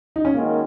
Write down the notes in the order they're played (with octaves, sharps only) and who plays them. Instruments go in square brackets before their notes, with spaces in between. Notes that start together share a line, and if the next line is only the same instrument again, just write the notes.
[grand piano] D#4
C#4
[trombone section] F#2 D#3 G#3 [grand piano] A#3